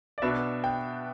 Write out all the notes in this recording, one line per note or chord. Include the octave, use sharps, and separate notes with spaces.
D5
B2 B3 D4 E5
G5